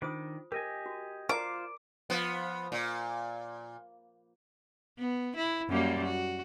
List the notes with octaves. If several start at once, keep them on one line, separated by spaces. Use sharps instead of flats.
D#3 D4 F4 C5 D#6
G4 A#4 D#5 G#5
F#4
F4 A#4 C5 D5 A#5 D6
F3 B3
A#2
B3
E4
F#2 G3 A#3
F#4